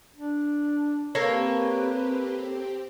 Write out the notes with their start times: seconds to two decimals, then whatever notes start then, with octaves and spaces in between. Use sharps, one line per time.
0.16 D4
1.15 A#3 C4 G4 A4 B4 C#5